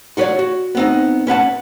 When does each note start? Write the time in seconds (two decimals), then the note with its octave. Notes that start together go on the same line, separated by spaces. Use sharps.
0.17 F4 F#4 B4 C#5 D5
0.39 F#4
0.75 B3 C4 D#4
1.27 C#4 B4 F#5 A5